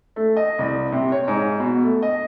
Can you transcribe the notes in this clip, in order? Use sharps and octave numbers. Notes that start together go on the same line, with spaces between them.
A3
D#5
C2
C3
C#5
G#2
B2
A3
D#5